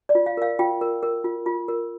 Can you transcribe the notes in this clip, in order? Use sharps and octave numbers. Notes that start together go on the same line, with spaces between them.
D5
F4
F5
A#4 F5
F4 G5
A#4
A#4
F4
F4
A#4